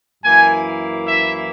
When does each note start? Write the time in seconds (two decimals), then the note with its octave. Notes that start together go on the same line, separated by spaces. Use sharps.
0.23 F#2 E3 A#3 E4 G#5
1.07 E5